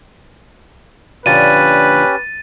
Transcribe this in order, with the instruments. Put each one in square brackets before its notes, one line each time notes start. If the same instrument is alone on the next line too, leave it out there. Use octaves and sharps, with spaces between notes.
[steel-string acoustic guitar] A#2 D3 F3 [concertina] C#4 G4 [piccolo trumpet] B4 [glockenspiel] A6 D#7